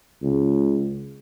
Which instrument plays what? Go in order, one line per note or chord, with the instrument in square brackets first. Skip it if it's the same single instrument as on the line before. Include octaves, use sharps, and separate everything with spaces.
[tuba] C#2